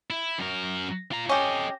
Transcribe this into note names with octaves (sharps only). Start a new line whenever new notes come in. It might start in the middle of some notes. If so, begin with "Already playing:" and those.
E4
F#2 A#4
F4 A#5
C#4 G4 A4 D#5